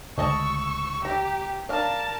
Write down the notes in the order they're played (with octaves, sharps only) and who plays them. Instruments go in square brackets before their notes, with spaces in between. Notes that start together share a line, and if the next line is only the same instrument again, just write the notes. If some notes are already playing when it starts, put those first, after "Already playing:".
[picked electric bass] C#2 D3 [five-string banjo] A3 D#5 A5 [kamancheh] C#6 E6
[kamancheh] G4 [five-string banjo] A#5
[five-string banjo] D4 F5 [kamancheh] A#4 A5